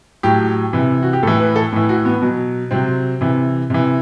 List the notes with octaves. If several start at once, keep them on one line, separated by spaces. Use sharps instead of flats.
A2 F#3 G4
C3 E3
F#4
G4
A2 E3 A4
B4
A4
A2 E3
F#4
B3
B2 F#3
C3 F#3 C4
C3 E3
C3 E3